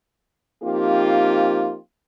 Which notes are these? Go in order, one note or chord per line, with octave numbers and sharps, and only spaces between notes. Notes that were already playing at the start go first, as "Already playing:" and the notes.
F3 A#3 C4 D#4 F4 G4